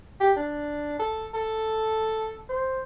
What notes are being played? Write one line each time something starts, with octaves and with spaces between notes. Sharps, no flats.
G4
D4
A4
A4
C5